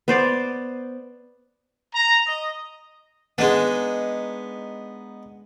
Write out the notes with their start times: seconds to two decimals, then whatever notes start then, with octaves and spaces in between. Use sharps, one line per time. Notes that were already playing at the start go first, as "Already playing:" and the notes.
0.08 B3 C5 D5
1.94 A#5
2.27 D#5
3.38 G#3 B3 D4 D#4